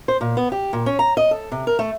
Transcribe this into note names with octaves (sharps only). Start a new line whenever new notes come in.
C5
A#2
B3
G4
A#2
C#4
A#5
D#5
A4
C3
A#4
A3